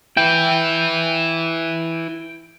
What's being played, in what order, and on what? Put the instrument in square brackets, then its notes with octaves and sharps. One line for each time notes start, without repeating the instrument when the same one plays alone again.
[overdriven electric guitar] E4 B4 [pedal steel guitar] G5